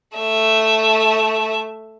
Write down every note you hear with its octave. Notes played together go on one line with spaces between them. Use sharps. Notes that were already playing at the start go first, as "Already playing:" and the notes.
A3 E5